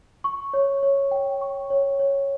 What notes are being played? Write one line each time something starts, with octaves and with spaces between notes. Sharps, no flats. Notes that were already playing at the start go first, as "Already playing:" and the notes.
C#6
C#5
C#5
G5
C#6
C#5
C#5